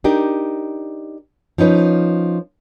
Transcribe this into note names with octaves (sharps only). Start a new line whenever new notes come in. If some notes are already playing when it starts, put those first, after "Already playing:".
D4 D#4 G4 A#4
F3 C#4 D#4 B4